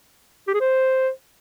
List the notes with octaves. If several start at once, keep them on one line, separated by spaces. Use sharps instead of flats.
G4
G#4
C5